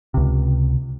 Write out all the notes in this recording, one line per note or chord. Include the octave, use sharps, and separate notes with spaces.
C#2 C3